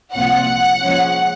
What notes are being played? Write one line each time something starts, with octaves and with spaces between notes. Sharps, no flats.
C2 A#2 F3 C4 F4 F#5
A#2 F3 G#3 C#4